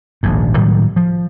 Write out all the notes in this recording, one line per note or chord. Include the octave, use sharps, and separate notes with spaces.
D#1 A#1 G#2
A2 D#3 F#3 G3
F3